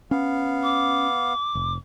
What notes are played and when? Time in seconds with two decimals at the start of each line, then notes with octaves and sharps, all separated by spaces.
0.11 B3 C#4 F5
0.63 D6
1.55 F1